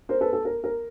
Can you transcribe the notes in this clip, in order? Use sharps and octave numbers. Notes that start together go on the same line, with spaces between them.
A#4 C5
A4 B4
A4
A#4
A#4